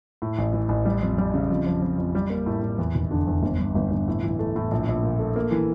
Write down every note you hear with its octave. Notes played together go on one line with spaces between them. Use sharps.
A2
A1
E3
A1
G3
F2
G3
C#3
F2
F3
F2
F2
G3
A#3
A2
A2
E2
F1
D3
E2
G1
G2
G1
G1
A2
E3
A3
A2
A#1
A#1
A#2
A3
A#3
E3